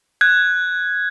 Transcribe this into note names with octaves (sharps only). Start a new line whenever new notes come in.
F#6 G#6